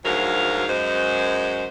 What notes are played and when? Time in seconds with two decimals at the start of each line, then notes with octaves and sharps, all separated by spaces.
0.04 D2 G#2 F3 F#3 A#4 F5
0.69 F#2 G#3 C5